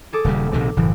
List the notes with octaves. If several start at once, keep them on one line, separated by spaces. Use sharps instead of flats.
G#4 A4 D6
D#1 C#3 G3
A#1 C3 D#3
F#1 A2 E3